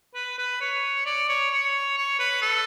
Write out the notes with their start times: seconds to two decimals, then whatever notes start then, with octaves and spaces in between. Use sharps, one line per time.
0.15 B4
0.38 B4
0.61 C#5
1.06 D5
1.29 C#5
1.52 C#5
1.97 C#5
2.20 B4
2.42 A4